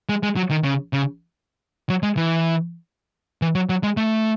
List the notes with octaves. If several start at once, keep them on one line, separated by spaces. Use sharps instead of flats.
G#3
G#3
F#3
D#3
C#3
C#3
F#3
G#3
E3
E3
F#3
F#3
G#3
A3